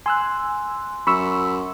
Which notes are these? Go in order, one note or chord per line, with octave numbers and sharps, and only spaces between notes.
G#5 C6 E6 F#6 C7
F#2 B5 C#6 E6